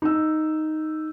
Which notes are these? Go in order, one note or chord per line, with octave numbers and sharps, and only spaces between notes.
D#4 E6